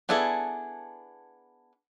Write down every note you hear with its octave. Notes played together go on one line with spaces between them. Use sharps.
B3 D4 E4 G#4 A4